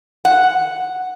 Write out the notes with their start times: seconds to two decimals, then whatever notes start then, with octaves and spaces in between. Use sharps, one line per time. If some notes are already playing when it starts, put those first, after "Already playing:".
0.25 F#5